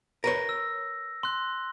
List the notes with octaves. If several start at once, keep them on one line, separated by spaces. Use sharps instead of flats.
A#4 B4 C#5 A#6
E6
C6 F#6